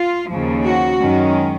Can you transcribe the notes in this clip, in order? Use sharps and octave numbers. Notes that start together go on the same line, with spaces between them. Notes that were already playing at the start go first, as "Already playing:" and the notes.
Already playing: F4
D#2 C#3 F3
F#4
F#2 D#3 G#3 C#4